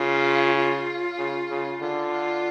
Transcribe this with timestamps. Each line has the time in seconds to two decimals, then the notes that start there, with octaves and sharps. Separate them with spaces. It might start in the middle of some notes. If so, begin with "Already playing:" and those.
Already playing: C#3 F4
0.57 F4
1.18 C#3
1.50 C#3
1.81 D3 F4